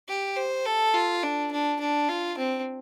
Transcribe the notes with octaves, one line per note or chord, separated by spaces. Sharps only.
G4
C5
A4
F4
D4
D4
D4
F4
C4